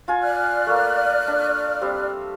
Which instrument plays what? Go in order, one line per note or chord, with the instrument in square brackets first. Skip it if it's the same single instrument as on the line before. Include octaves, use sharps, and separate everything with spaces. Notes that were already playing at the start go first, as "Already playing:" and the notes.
[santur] F4 G#5
[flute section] D5 F6 F#6
[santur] A3 A#3
D4
G3 C4